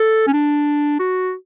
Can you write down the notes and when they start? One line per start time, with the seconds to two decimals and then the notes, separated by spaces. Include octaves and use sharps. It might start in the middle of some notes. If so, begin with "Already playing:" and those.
Already playing: A4
0.27 C#4
0.33 D4
0.99 F#4